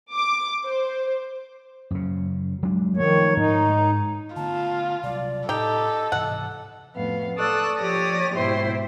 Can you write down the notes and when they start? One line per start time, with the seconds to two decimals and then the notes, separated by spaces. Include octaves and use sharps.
0.13 D6
0.64 C5
1.91 F#2 C#3
2.63 F#3 G#3 D4
2.97 D#3 F3 A3 C#5
3.37 G#2 D#4
4.36 D3 A3 B3 F4 A5
5.03 C3 F#3 G3 D5
5.49 A2 D#4 G4 A4 D#5
6.12 G#2 C3 E3 F#5
6.95 F2 A2 B3 F5
7.36 A4 D5 C#6 D#6 E6 F#6
7.79 F3 G4 C#5 D5 D#6 A#6
8.34 G#2 B2 E4 C5 G5 C6